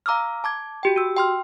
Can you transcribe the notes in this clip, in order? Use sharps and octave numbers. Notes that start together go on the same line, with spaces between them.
F5 A#5 D6 E6 F6
A5 D6 G#6
F#4 G4 G5
F#4 E6
G5 C6 F6